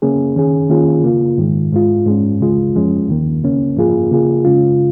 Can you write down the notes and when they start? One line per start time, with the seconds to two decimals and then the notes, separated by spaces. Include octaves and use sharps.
0.02 C#3 A#3 C#4 G#4
0.36 D#3 C#4 G#4
0.69 D#3 A#3 C#4 F4 G#4
1.04 C#3 A#3 F4
1.38 G#2 D#3 G#3
1.72 G#2 G#3 F4
2.06 G#2 G#3 C#4
2.40 C#2 C#3 G#3 F4
2.75 F2 F3 G#3 C#4
3.08 D#2 D#3 A#3
3.42 C#2 C#3 A#3 C#4
3.77 G#2 F3 A#3 F4 G#4
4.11 C#3 A#3 F4 G#4
4.45 C#3 G#3 C#4 F4